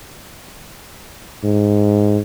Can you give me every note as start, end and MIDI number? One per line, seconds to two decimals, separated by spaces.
1.44 2.20 44